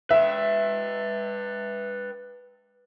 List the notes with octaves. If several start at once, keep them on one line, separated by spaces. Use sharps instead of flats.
B4 E5 G5